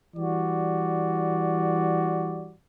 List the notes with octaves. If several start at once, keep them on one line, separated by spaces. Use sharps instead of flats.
E3 G3 F#4 D5